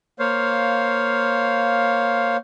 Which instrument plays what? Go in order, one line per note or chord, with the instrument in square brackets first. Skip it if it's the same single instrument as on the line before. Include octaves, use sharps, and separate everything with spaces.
[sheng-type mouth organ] A#3 C5 C#5 F5